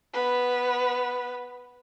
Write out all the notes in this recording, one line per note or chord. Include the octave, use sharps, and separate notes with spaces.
B3 B4